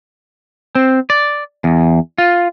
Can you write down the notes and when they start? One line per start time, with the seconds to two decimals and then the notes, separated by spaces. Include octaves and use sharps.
0.75 C4
1.10 D5
1.64 E2
2.18 F4